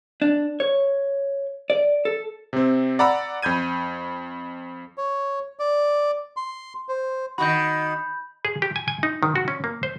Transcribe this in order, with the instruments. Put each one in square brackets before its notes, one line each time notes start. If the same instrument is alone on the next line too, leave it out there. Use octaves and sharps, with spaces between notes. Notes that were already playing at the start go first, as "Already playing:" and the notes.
[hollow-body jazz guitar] D4
C#5
D5
A4
[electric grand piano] C3 C4
D5 F#5 A#5 B5 E6
F2 B5 G6 G#6 D#7
[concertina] C#5
D5
C6
C5
[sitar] D#3 F#4 [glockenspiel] B5 G6
[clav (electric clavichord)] G#4
G4
G#5
G#5
D#4
D#3
F#4
C#4
A#3
C5